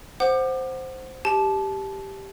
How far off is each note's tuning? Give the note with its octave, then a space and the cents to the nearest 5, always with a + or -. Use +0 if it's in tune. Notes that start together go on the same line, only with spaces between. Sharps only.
C5 +0 F#5 +0 D6 +30
G4 +0 A5 -25